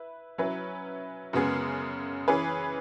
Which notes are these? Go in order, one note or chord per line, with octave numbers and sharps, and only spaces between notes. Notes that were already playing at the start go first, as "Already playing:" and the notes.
Already playing: E4 B4
F#3 C#4 E4 B4
F#2 C#3 G#3 B3 G#4
E3 C#4 G#4 B4